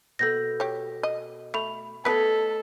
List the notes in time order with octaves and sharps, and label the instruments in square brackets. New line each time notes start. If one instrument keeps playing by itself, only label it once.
[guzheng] B2 B3 [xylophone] A4 G6 A#6
[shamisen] G4 C#5
D#5
[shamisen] A3 [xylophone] B5 F7
[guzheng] A3 C#5 D#5 [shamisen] B3 B4 [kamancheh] A4 [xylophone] B6